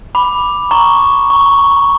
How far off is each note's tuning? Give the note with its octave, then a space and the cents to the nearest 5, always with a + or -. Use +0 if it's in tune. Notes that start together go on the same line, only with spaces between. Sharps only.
B5 +0 D6 +0
A#5 +0 C#6 +0
A#5 +30 C#6 +0